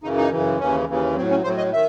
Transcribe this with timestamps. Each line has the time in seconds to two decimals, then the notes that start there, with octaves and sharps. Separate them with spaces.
0.03 F#2 C#3 E3 D#4
0.17 D#4
0.31 F#2 C#3 E3
0.59 D#2 C#3 E3 C#4
0.88 D#2 C#3 E3
1.16 A2 F#3 C4
1.31 C#4
1.44 A2 F#3 C5
1.58 D#5
1.73 D#3 E5